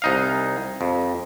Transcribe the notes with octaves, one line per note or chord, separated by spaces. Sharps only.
C2 D#4 F5
F2